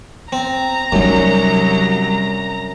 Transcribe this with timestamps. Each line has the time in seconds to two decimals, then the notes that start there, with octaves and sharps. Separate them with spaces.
0.33 C4 A#5
0.92 C2 F#2 F#3 G3 D#4